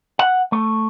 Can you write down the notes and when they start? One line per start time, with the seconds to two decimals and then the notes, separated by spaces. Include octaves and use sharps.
0.19 F#5
0.52 A3